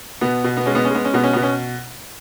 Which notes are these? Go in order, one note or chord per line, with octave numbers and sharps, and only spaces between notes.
B2 B3
B2
B3
G#3 C#4
B3
C#4
G#3 B3
C#4
B2 B3
C#4
B2 B3
C#4